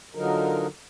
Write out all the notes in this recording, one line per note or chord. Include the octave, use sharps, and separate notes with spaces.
D3 F3 F#3 D#4 A#4